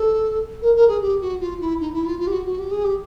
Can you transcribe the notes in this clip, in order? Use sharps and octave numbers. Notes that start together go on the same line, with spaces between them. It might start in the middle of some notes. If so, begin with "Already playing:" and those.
Already playing: A4
A#4
A#4
G#4
G4
F#4
F4
E4
D#4
E4
F4
F4
G4
F#4
F#4
G4
G#4
G4